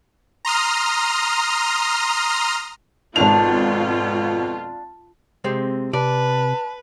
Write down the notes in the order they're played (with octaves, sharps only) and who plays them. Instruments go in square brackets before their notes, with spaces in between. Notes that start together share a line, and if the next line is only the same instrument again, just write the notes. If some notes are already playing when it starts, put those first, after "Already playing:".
[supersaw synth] A#5 C6 D#6 F6
[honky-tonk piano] G#1 F7 [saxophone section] F2 B2 [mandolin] D4 [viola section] F4
[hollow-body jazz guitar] C3 G#3 C4
[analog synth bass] C3 [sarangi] B4 [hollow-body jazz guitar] D5 [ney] A5